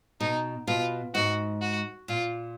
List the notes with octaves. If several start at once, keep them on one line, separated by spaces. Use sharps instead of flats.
B2 D#4
B2 F4
G#2 F#4
F#4
A#2 F4